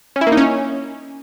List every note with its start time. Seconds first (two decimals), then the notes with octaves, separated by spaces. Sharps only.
0.16 C#4
0.21 E4
0.27 A#3
0.32 D#4
0.37 C#4